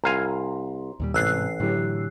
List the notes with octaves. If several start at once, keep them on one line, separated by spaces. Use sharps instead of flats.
C2 F5 G#5 A#5 C6
D#2 A#2 G3
A1 G#2 C3 E6 F#6 C7
A2 D3 E3 F#3 G4